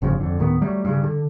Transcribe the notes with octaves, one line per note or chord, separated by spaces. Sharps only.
G1 G2 C#3 F3
F2 D3
D1 D#3 A#3 B3
F#3 G3 A3
G2 C#3
D3